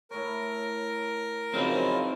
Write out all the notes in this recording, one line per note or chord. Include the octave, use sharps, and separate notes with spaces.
A2 A#4 C#5
F#2 C#3 E3 F3 C4 D#4 F5 B5